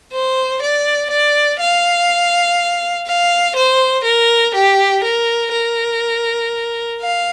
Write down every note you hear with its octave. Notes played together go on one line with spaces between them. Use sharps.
C5
D5
D5
F5
F5
C5
A#4
G4
A#4
A#4
F5